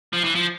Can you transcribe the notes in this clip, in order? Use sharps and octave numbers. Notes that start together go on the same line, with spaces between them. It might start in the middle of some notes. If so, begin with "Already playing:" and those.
F3
E3
F3